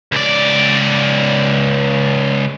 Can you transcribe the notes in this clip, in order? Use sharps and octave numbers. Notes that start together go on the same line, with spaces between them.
C#2 D5